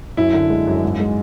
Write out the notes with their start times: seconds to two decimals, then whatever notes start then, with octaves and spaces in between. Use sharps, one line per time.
0.17 F#2 E4
0.33 D3
0.50 G#3
0.67 F#2
0.83 G#2
1.00 G#3